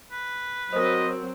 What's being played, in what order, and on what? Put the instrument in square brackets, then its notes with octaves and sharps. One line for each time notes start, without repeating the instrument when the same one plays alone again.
[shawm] B4
[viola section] F#3 C4 [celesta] A#4 C5 [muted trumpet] D#5